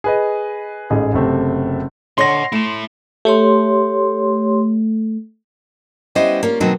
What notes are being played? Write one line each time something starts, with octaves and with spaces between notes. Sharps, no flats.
G#4 B4 D#5
A1 G#2 G#4 A4
F#1 C3 A3 C4
D3 C#5 D#5 F#5 C6 A#6
A3 E4 A5
A3 G4 C#5 C6
G3 B3 C#4 E4 C5 D#5
A#3 C#4 F4
B2 D#3 F#3 A#3 C4 D#4